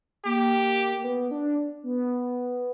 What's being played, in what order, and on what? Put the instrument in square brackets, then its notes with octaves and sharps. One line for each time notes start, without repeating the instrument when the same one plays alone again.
[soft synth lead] A#3 [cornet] G4
[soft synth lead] A#3
B3
D4
B3